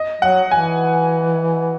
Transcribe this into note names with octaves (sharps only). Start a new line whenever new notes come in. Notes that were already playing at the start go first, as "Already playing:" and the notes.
Already playing: D#5
F#3 F#5
E3 G#5